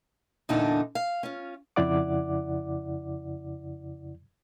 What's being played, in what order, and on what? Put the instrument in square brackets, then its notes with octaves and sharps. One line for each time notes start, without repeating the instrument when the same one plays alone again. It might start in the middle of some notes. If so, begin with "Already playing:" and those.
[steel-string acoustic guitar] E2 A#2 D3 D4 D#4 A4
F5
C#4 F4
[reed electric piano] F2 C#3 E4 D5 F#5 D6